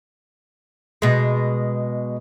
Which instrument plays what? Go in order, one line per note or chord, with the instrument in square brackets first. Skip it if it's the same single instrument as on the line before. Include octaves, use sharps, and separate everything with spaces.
[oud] B2 G#3